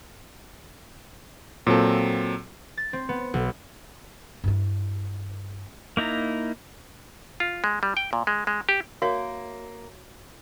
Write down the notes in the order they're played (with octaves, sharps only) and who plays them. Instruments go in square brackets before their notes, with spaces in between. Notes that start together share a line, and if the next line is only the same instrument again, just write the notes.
[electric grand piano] A#2 F#3 C4 A4
[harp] A6
C4
B3
B1
[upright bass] G2 E4
[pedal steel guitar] A#3 D#4 E4 A#5
[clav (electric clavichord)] F4
G#3
G3
G5
A#2
G#3
G#3
G4
[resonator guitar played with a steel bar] A#3 [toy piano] F#4 C#5 E5